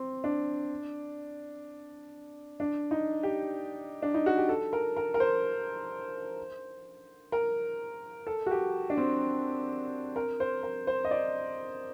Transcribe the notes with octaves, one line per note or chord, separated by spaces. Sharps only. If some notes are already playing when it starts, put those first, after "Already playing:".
Already playing: C4
D4
D4
D#4
G4
D4
D#4
F#4
G4
A4
A#4
A#4
A#4
C5
A#4
A4
F#4
G4
D4
C4
A#4
C5
A#4
C5
D#5
D5